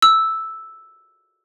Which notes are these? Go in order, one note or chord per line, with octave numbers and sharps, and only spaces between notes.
E6